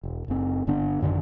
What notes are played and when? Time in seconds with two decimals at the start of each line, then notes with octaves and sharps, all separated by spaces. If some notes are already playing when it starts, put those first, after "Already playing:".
0.04 E1
0.28 F#1 C4
0.67 G1 D3 B3 D4
1.01 A1 F#2 D3 D#3